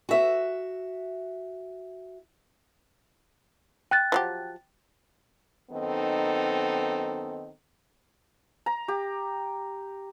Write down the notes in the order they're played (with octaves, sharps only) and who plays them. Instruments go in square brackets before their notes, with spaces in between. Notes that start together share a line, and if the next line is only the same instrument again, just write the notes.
[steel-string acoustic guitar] F#4 E5
[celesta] G5 F#6 A6
[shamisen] F3 F#3 G4
[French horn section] F#2 D#3 B3 C4 D#4 A4
[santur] A#5
G4